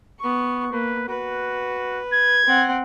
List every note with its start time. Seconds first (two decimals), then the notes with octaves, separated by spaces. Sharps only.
0.20 B3 C#6
0.73 A#3 B4
1.09 F#4 B4
2.14 G#6
2.46 C4 F#5